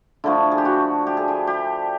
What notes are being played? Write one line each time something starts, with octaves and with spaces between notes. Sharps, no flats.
D3 F3 A3 E4
G#4
G4
F#4
G4
G#4
G4
G4